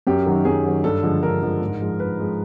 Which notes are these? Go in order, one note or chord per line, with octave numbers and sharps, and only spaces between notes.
F#2 G4
D#3 F#3
F#2 G#4
D#3 F#3
G2 A4
D3 F3 G#3
G2 A#4
D3 F3 G#3
G#2
F3 G#3
G#2 B4
F3 G#3